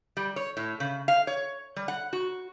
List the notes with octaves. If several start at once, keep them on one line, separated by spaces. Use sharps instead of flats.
G3
C#5
A2
C#3
F5
C#5
G3
F#5
F#4